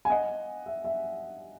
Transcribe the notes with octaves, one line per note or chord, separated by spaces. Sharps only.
G#5
D#5 F#5
E5
E5